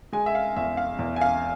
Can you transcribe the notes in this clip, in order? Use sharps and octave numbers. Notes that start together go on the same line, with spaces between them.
G#3 G#5
E5
F5
E2 E5
F5
E2
G#5
F5